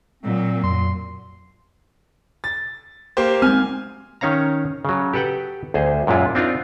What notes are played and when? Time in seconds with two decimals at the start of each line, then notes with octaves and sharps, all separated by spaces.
0.23 A#2 F#3 C4
0.64 F2 C6
2.44 A6
3.17 A#3 G4 C5
3.42 G#3 C4 G#5 F6
4.21 D#3 C#4 C#5 F5 A#5
4.85 C#3 F#3
5.14 G4 A4 B4 F#5 G5
5.74 D2 G#4 C5
6.07 F#2 A#2 G#3 E4 F4
6.35 C4 D4 D#4 F4